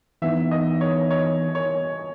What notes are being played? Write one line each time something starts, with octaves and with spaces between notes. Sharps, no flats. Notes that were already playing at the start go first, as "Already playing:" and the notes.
E3 B3 D#4 E5
D#5
C#5
C#5
C#5